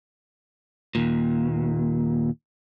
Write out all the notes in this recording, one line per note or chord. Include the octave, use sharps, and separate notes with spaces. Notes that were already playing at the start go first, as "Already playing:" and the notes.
D#2 A#2